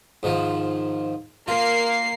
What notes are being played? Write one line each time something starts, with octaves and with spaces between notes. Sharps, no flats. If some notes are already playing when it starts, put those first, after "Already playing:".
G#2 D#3 F3
A#3 F4 C7